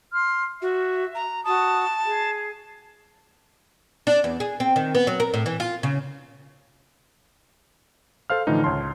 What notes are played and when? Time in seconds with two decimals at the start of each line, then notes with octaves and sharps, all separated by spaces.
0.13 C6 F6
0.62 F#4 E5
1.15 A#5
1.44 F#4 A5 D#6
2.05 G#4
4.07 D4
4.24 E2
4.40 G#4
4.60 C4
4.76 D#3
4.95 B3
5.07 F#3
5.20 A#4
5.34 A2
5.46 E3
5.60 F4
5.83 C#3
8.30 A4 C5 F5 F6
8.47 A2 D3 E3 F3 D#4
8.64 C#2 C#5 A5 C6